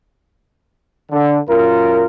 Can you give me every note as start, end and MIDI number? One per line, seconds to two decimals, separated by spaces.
1.11 1.37 50
1.49 2.04 42
1.49 2.04 65
1.49 2.04 70